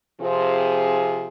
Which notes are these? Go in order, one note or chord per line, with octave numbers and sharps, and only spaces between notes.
C3 F3 C4 F4 G#4